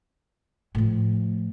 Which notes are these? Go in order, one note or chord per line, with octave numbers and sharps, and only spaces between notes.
A2 F3